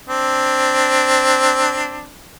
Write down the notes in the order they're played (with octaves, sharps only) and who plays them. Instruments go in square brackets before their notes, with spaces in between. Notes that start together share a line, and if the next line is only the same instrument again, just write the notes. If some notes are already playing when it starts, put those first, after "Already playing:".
[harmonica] C4 D4